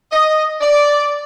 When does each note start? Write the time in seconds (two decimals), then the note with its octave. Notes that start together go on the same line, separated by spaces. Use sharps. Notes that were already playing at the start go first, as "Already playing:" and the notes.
0.11 D#5
0.61 D5